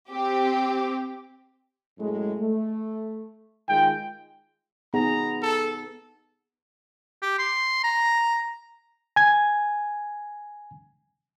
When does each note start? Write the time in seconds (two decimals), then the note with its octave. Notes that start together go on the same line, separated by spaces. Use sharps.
0.11 C4 G4
1.98 F#2 A2 G#3
2.38 A3
3.69 D#3 G#3 F4 G5
4.94 B3 D#4 G#4 A#5
5.42 A4
7.22 G4
7.39 C6
7.84 A#5
9.16 G#5 G#6